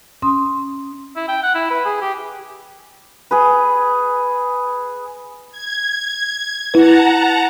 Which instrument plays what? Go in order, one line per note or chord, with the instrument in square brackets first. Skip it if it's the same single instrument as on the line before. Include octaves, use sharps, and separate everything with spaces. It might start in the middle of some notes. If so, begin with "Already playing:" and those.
[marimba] C#4 C6 D#6
[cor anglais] E4
G5
F#5
E4
B4
G#4
G4
[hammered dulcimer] G#4 B4
[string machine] G#6
[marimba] E4 B4 [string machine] F#5 A5 A#5